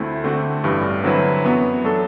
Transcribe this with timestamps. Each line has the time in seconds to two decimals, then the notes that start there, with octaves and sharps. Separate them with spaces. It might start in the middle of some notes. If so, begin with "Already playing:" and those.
Already playing: D2 A3 C4 E4
0.24 D3 A3 C4 F#4
0.64 A1 G2 E3 G3
1.04 D3 F#3 C4 E4 B4
1.43 F#2 E3 B3 F#4
1.84 F#3 A3 D4 A4